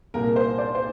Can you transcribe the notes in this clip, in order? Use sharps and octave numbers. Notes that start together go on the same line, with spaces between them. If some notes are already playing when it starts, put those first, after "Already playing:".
C2 A#2 A#3 A#4
A#4
C5
D5
C5